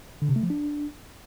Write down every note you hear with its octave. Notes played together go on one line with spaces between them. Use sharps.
D3
C3
A3
F3
D4